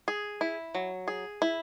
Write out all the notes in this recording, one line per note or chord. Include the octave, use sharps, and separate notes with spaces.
G#4
E4
F#3
G#4
E4